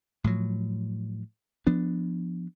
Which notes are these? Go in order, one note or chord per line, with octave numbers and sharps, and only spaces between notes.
A2 F3 F#3
F3 B3 D4